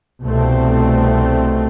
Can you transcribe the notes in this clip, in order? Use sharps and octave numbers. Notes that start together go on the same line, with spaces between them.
C2 B2 A3 C4